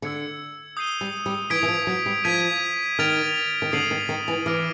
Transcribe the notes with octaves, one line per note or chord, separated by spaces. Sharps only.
D3 E6 G#6 C#7
D#6 G6 C7 D#7 G7
G3
G3
E3 D#6 G#6 B6 D7
E3
F3
F#3
G3
F3 G#6 B6 D#7
D#3 F6 A6 D7 F7
D#3
D3 D#6 G#6 C7 D#7 F#7
D#3
D#3
E3
E3 D6 F6 A#6 D7